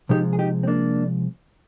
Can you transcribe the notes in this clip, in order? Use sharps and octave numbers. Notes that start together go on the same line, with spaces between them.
C3 F3 G#3 D#4 G4
G#4
D#4 G4
C4
A#3 D4